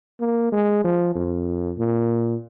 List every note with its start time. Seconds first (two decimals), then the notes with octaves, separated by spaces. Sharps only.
0.20 A#3
0.52 G#3
0.84 F3
1.15 F2
1.78 A#2